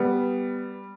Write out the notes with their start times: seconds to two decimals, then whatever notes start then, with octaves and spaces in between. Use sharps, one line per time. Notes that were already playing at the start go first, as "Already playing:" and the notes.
Already playing: G3 B3